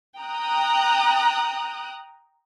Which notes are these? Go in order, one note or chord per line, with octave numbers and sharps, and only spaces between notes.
G5 A#5 D#6 F#6